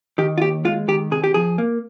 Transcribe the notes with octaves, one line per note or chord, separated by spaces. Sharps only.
D#3 G4
F4
D#2 G4
G#3 F4
D#3 G4
C3 G#4
G4
F3 G#4
A#3